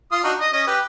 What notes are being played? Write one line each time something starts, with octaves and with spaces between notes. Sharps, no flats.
F4 D#6
D4 D#4 F#4
D#5
C#4 D#5
G4 B4